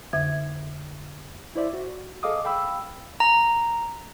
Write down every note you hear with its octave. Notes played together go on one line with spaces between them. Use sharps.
F2 D3 E5 G#6
E4 C5 D5 E5
F#4
G#4 A4 D#5 F5 D6 D#6
F5 G5 B5 E6
A#5